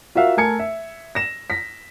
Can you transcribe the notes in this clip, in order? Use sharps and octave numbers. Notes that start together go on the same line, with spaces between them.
F4 F#4 A#4 E5 F5
A3 A#4 G#5 A5 G#6 C#7
E5
A#6 E7
A#6 B6